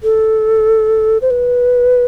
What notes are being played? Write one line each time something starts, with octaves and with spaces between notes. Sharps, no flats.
A4
C5
B4